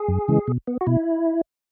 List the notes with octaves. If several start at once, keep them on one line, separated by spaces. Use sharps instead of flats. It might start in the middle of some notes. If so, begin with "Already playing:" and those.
Already playing: G#4
F#2
C#3 E3 G#3
B2
B3
F#4
B2 E4